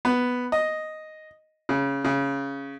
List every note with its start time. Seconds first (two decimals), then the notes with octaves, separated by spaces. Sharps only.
0.05 B3
0.52 D#5
1.69 C#3
2.05 C#3